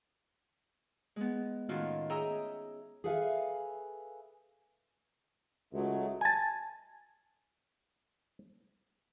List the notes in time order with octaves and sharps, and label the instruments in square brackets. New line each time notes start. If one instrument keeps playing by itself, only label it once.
[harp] G#3 B3
A2 D#3 C#4 F4 F#4
G#4 C#5 D#5 E5 G5 A#5
[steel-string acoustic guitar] G#4 A4 B4 E5 F5 G#5
[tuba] C#2 [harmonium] F#3 G#3 A3
[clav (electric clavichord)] G#5 A5